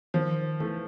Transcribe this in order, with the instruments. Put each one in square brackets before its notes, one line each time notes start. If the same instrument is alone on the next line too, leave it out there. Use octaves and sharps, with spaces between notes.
[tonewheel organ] D#3 [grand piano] F3
[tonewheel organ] E3 [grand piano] A3